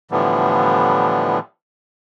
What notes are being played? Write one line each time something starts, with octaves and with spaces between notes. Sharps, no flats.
A2 D3 E3 F3 G3 B3